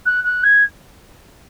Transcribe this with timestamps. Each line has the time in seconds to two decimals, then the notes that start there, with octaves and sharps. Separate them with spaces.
0.05 F#6
0.24 F#6
0.43 G#6